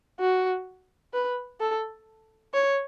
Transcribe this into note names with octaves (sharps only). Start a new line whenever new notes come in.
F#4
B4
A4
C#5